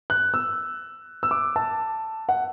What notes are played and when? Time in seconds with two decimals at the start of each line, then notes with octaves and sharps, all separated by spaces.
0.10 F#6
0.34 E6
1.23 E6
1.31 D6
1.56 A5
2.29 F#5